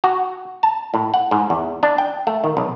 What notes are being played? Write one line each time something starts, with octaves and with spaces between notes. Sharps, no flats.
F#4
A5
A2
F#5
G#2
E2
D4
G5
A3
D#3
B1